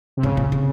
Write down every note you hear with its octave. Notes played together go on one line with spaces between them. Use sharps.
C3
G#2 C#3
A#2
C3